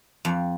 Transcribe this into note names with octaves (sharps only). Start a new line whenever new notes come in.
F2